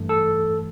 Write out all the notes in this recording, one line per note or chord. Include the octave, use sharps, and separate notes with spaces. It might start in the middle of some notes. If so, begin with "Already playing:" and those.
Already playing: G2 E3 A3
A4